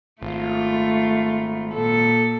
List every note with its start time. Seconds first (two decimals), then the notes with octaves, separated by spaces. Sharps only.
0.22 G#1 A3 F4
1.71 A#2 A4